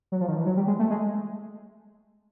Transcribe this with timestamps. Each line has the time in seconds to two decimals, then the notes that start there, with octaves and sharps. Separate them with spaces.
0.12 F#3
0.21 F3
0.28 D#3
0.37 E3
0.46 F#3
0.57 G3
0.67 G#3
0.79 A3
0.90 G#3